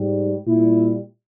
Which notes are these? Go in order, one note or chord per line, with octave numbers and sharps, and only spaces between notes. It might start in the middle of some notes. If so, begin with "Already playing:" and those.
Already playing: G#2 G3
A#2 G3 E4